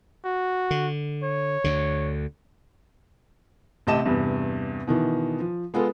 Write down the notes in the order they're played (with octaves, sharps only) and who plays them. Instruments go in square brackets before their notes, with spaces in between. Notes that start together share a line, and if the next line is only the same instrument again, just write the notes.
[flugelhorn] F#4
[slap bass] D3
[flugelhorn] C#5
[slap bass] D2 D3
[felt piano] A1 C3 G4 D#5 A5 E7
E2 G2 C3
B2 D#3 E3
F3
G#3 B3 F4 A4